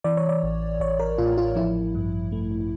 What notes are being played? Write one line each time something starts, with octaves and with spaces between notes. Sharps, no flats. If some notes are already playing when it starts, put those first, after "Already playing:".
E3 D5
C#5
D5
A1
A1 C#5
A#4
A2 F4
F4
F3 E4
G2
A3